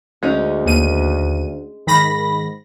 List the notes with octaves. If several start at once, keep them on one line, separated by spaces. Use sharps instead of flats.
D2 G#3 C#4 D#4
D#2 D#7
G#2 D#3 B5 A#6